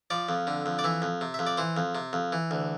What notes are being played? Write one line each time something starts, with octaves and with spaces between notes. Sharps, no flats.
F3 D5
F2
D3
F2
D5
E3 E5
F2
C3
F2 E5
D5
E3 C5
F2
C3
F2
E3
D2